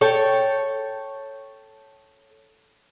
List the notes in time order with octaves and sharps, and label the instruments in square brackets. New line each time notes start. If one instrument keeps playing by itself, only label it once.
[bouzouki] A4 C#5 G5